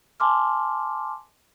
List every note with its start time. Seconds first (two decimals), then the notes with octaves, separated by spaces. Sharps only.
0.20 G#5 A5 C6 D6 F6